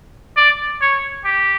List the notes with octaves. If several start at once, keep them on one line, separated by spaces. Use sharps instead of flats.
D5
C#5
G4